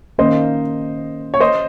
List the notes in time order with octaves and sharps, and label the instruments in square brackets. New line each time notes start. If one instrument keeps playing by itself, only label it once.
[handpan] D#3 A#3 C#4 [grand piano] C5 D#5
[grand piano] C#5
C5 D#5